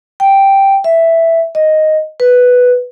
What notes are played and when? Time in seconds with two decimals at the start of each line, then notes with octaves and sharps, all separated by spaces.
0.20 G5
0.84 E5
1.55 D#5
2.20 B4